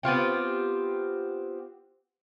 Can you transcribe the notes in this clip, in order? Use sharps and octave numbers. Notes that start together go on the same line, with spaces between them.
B3 C4 F4 G4